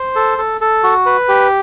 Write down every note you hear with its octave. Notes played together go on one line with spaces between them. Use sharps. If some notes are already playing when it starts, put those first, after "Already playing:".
Already playing: C5
A4
A4
A4
F#4
B4
G4